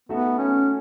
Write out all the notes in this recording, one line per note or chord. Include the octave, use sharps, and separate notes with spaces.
A3 B3 D#4 F#4 A4 E5
C#4